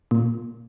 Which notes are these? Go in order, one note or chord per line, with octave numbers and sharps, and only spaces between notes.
A#2